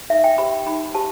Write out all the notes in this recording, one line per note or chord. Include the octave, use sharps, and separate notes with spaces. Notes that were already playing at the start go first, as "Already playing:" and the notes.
D#4 E5
G5
G4 C5 B5
D#4 B5
G4 C5 A5